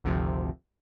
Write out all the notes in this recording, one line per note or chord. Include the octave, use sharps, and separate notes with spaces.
G#1 D2 C3 F3